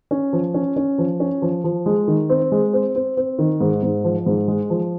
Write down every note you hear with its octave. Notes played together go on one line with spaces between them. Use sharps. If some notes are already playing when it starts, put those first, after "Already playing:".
C#4
F3
C#4
C#4
F3
C#4
F3
F3
G#3
D#3
C4
G#3
C4
C4
C4
D#3
G#2
G#2
F3
G#2
G#3
F3